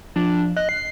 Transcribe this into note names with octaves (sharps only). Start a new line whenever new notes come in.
F3 D4
D#5 F#6
C7